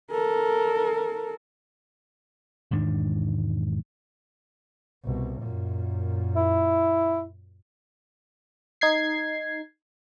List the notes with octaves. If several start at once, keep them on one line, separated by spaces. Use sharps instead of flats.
A4 A#4
E1 G#2 D#3 D4
C2 B2
F#2 A#2
E4
D#4 G#6 C7